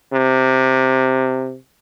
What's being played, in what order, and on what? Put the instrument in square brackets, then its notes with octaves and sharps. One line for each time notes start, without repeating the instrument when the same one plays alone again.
[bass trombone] C3